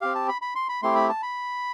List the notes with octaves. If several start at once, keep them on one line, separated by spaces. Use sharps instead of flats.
C4 G4 F5
A5
B5
B5
C6
B5
A3 C4 E4 G4 C6
B5
A5
B5